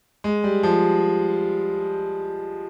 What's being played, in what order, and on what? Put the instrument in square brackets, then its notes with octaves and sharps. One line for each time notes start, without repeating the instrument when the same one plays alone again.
[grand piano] G#3
G3
F3